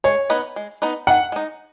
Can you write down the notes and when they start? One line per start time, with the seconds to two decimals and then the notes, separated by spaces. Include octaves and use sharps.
0.04 G#3 C#5
0.30 B3 D#4 B4 D#5
0.56 G#3
0.82 B3 D#4 B4 D#5
1.07 D#3 F#5
1.32 G#3 D#4